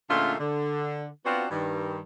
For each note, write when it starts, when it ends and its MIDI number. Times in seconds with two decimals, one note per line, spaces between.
0.10 0.34 46
0.10 0.34 50
0.10 0.34 56
0.10 0.34 57
0.10 0.34 61
0.10 0.34 65
0.39 1.05 50
1.25 1.45 59
1.25 1.45 60
1.25 1.45 62
1.25 1.45 65
1.25 1.45 66
1.50 1.99 43
1.50 1.99 51